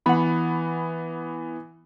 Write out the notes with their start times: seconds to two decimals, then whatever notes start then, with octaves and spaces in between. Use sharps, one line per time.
0.06 E3 B3 F#5 B5